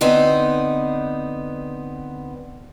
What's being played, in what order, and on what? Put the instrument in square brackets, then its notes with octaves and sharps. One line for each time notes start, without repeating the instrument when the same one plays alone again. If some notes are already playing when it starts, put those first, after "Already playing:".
[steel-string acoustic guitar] D3 B3 C4 D#4